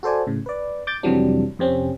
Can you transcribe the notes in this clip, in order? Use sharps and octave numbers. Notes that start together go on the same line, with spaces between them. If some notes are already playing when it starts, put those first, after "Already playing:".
F#4 A4 C5 D5 G#5
A2 C#3
B4 D5
D6 G6 A6
F2 C3 E3 F#3 G3 D4
F2 C3 C4 C#4